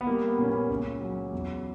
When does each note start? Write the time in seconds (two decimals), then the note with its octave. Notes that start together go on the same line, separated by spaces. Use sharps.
0.01 B3
0.07 G3 A#3
0.28 B3
0.38 A#2 C#4
0.49 B3
0.70 C#2 C#4
1.01 F#3
1.33 E2